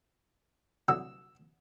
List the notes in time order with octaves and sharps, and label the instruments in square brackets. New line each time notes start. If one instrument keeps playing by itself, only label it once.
[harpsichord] C2 D3 F#3 [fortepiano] E6